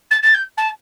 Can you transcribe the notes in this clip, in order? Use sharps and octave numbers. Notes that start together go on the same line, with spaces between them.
A6
A6
G6
A5